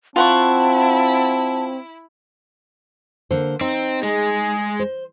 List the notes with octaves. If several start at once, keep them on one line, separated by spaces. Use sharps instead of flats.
C4 E4 F4 F#5 A5 C#6
D3 A#3 C5
C4 D#4
G#3 G#4
C5